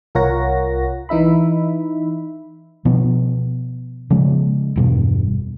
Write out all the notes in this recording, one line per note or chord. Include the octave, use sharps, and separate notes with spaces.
C2 F4 A#4 C#5 F#5 A#6
E3 D#4 E5 B5
B2 F3 B3
C#3 F3 G#3
E1 G2 B2